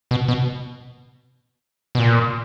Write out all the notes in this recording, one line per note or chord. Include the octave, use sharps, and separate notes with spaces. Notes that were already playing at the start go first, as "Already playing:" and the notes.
B2
B2
B2
A#2